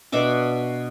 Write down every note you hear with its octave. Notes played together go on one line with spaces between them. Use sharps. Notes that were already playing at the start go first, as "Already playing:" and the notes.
B2 D4 E5 D6